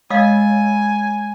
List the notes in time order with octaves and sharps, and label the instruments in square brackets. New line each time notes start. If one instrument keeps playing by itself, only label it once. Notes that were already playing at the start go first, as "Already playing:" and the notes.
[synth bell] G#3 [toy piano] D#5 F5 D#6 [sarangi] G#5